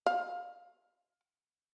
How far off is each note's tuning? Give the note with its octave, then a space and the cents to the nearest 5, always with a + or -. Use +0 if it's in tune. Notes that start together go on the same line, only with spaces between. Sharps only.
F5 +25